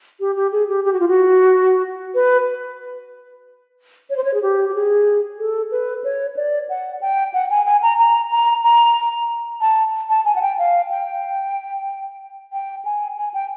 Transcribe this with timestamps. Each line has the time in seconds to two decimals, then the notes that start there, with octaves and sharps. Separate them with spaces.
0.20 G4
0.36 G4
0.52 G#4
0.69 G4
0.85 G4
0.93 F#4
1.00 F4
1.08 F#4
2.15 B4
4.10 C#5
4.17 C5
4.24 C#5
4.34 G#4
4.42 G4
4.70 G4
4.74 G#4
5.39 A4
5.71 B4
6.04 C#5
6.37 D5
6.69 F#5
7.01 G5
7.34 F#5
7.50 G#5
7.66 G#5
7.83 A#5
7.98 A#5
8.31 A#5
8.63 A#5
9.61 A5
10.09 A5
10.25 G#5
10.36 F#5
10.42 G5
10.59 F5
10.91 G5
12.53 G5
12.85 G#5
13.18 G#5
13.34 G5